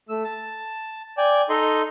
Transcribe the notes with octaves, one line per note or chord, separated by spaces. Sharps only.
A3 E6
A5
D5 G5 G#5
D#4 A4 D#5 C6